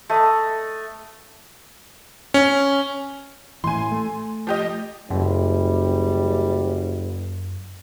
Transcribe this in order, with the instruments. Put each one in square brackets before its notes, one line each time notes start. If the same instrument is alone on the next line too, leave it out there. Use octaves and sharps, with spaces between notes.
[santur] A3 D#5
[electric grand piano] C#4
[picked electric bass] A2 E3 [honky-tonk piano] G#5 C6
[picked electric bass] A3
[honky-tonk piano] F3 G4 D#5
[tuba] F#1 [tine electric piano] F#2 [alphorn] G3